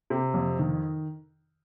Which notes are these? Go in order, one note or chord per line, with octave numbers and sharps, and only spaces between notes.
C3
F2
D#3